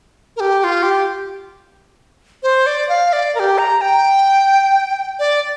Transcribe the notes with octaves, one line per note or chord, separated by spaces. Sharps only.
A#4
G4
G4
F4
G4
C5
D5
F5
D5
A#4
G4
A#5
G5
D5